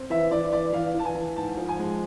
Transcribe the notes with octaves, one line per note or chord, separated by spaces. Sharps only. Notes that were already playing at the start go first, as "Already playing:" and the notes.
Already playing: C4
E3 E5
E3 D5
E3 D5
E3 F5
E3 A5
G#5
E3
G#2 A5
F3
G#5
G#3